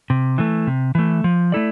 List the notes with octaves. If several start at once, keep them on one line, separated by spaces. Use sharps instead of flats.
C3
E3 A3
C3
E3 A3
F3
A3 E4 A4 D5